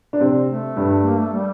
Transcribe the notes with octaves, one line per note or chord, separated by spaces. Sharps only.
D4
C3 C4
A3
G2 G3
A#3
A3
G3